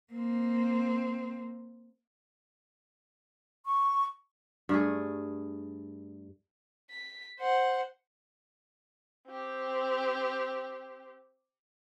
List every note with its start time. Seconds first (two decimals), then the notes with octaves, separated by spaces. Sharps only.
0.13 A#3 C4
3.65 C#6
4.69 G2 A3 G#4
6.90 B6
7.40 C5 F#5
9.27 C4 G4